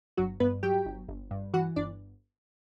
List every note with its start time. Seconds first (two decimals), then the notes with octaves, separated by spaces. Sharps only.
0.17 G1 F#3 F#4
0.40 G2 B3 B4
0.63 F#3 G4 G5
0.85 G1
1.08 G1
1.31 G2
1.54 E3 F#4 F#5
1.76 G1 D4 D5